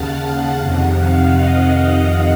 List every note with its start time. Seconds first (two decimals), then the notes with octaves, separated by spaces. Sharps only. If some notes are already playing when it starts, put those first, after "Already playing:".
Already playing: D#2 C#3 F5 F#5 A5
0.59 F2 C3 D#3 F#5
0.98 F5
1.35 D#5